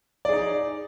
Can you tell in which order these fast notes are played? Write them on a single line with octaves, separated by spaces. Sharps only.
D5 G#4 D#4